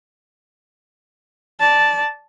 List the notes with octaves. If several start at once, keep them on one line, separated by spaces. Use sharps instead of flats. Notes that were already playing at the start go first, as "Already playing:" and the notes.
D5 A5